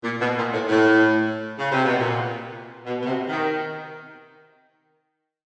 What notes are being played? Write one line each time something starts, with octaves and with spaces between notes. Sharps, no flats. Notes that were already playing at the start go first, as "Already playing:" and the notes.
A#2
B2
A#2
A2
A2
C#3
C3
B2
A#2
B2
B2
C3
D#3